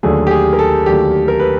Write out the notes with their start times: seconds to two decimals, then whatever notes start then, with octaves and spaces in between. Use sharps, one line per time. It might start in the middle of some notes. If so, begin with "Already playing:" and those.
0.03 D#2 D3 F#3 A3 G#4
0.27 G4
0.31 G#4
0.53 A#4
0.59 A4
0.86 D#2 D3 F#3 A3 G4
1.28 A#4
1.40 B4